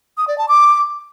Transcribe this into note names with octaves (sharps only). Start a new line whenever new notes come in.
D#6
D5
A5
D6